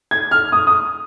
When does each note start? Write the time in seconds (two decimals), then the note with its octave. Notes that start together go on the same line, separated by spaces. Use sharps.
0.11 G#6
0.31 F6
0.52 D#6
0.67 D#6